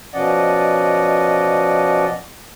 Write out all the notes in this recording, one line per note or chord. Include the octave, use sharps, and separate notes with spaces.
B2 F3 C#4 D5 D#5 F#5